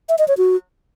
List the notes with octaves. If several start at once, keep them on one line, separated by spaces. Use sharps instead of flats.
E5
D#5
C#5
F#4